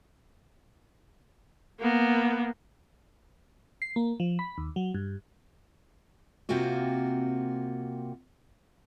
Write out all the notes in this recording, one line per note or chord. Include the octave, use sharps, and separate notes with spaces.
A#3 B3
C7
A#3
F3
B5
D#2
F#3
G2
C3 A#3 C4 F4 F#4